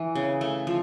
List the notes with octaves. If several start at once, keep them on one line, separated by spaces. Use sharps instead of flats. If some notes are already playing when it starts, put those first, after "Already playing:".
Already playing: E3
C#3
A3
F3